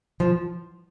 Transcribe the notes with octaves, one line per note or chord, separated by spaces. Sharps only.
F3